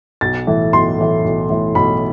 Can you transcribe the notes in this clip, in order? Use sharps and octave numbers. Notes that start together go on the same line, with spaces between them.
B1 A6
A2 E3 A3
B1 C6
A2 E3 A3
B1
A2 E3 A3
B1 B5